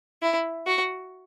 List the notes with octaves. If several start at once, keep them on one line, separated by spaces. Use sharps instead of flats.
E4
F#4